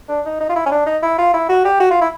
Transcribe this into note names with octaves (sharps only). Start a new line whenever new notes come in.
D4
D#4
D#4
F4
E4
C#4
D4
D#4
E4
F4
E4
F#4
G4
F#4
F4
E4